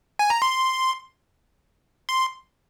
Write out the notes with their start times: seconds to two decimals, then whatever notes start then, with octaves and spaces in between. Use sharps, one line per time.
0.19 G#5
0.30 A#5
0.42 C6
2.09 C6